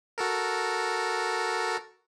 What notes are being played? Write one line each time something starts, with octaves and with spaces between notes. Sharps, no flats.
F#4 A4 A#4